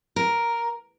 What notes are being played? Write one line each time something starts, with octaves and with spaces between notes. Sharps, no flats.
A#4